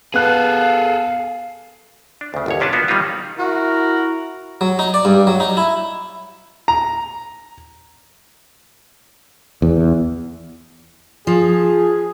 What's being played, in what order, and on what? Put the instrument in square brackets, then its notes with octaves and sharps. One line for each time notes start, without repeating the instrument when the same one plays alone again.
[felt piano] B3 F#6 [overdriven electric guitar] G#4 A4 [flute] F5
[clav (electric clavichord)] D4
D2 C#3
G1 D#2 C#5
C3 C#4 D4 B4 A5
A#3 B3 F4 F#4
D#3 G3 C#4 D#4 F4
[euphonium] E4 [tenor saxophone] F#4 [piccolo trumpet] A#4
[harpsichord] F#3
D#4
D5
G2
F#3
D#4
E4
[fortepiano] A#5
[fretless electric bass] E2
[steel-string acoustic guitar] F3 [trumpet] G#4